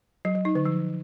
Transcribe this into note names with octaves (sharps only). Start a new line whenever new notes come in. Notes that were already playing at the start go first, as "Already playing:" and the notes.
F#3
F#3
D#4
D3
F3